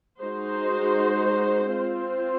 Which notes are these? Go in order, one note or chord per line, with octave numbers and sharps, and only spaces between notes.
G#3 D#4 F#4 C5
C4 F4 C5